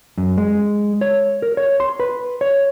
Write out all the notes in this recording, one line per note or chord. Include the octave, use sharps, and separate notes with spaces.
F#2
G#3
C#5
A#4
C#5
C6
B4
C#5